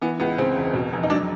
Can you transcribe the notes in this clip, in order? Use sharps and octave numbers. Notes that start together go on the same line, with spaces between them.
E3 B3
C#2 B3
C#3 C4
E1
B2
F1
D#4
F#3 D4